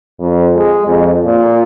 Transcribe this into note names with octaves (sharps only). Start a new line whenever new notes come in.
F2
G#3
F2
A#2